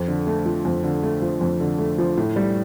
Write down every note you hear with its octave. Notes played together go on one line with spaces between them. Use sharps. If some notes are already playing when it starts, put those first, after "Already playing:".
Already playing: F2
D3
A3
F3
F2
D3
A3
F3
F2
D3
A3
F3
A2
G3